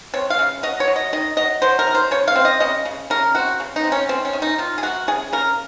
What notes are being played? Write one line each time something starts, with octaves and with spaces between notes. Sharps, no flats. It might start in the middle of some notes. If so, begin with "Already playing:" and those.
C4 C#5
F5
C#3
F#3 D#5
C#5
F#3
D#5
D#3 D#5
F#3 D#5
F#3 C5
A#4
D#3
C5
C#3 C#5
F5
C4
D#5
C#3 D#5
C#3
C#3 A#4
C4 F#4
C#3
D#4
C4
C#4
D#3 C4
C#4
D#3
D#4
D#3 F4
G#4
A#3 F#4
C#3 G#4
C#3 A#4